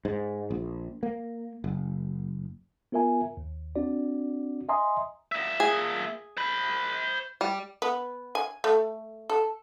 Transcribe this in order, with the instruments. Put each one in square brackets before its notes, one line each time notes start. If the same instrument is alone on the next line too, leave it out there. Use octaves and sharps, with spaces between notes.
[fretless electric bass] G#2
A#1
A#3
F#1
[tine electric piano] B3 F4 A#4 E5 G#5 A#5
D#2
C4 D4 F#4 D5
D#5 E5 G#5 A#5 C6 D#6
[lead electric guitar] A#2 E5
[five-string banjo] G#4
[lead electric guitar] C5 B5
[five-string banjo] G3
[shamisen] B3
G#5
A3
A4